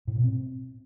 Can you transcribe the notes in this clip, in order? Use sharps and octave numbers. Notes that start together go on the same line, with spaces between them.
A2
B2
C4